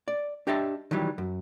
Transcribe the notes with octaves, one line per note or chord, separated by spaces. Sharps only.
D5
D4 G4 D#5 E5 A5
D#3 E3 F#3 G3
F#2